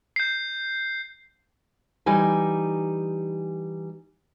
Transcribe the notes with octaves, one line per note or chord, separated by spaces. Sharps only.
G6 C7
E3 G3 D#4 G#5